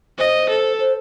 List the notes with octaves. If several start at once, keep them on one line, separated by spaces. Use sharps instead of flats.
C5 D#5
A4
C5